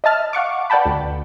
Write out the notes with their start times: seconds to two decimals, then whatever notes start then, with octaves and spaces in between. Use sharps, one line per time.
0.04 D#5 E5 A5 F6
0.33 F5 F#5 C#6 D6
0.70 B4 D5 F#5 G5 A5 B5
0.85 D2